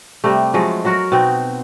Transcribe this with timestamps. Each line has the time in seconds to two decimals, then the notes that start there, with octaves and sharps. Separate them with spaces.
0.24 C3 G3 A3
0.54 F3 F#3 G#3 A3
0.85 F#3 F#4 A#4
1.12 B2 C4 D#4